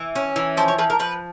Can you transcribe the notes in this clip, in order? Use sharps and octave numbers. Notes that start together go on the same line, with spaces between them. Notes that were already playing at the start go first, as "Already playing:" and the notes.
Already playing: E3
C#4
E3
F3 C5
C#5
F3 B4
A#4
F3 B4